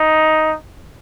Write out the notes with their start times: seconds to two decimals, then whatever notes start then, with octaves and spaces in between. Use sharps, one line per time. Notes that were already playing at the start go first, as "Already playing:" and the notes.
Already playing: D#4